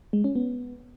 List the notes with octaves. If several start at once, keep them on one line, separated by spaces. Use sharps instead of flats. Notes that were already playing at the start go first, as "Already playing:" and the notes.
G#3
C#4
B3